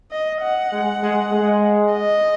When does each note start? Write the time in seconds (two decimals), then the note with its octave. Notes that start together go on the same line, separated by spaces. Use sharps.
0.12 D#5
0.42 F#5
0.72 G#3
1.02 G#3
1.32 G#3
1.93 D#5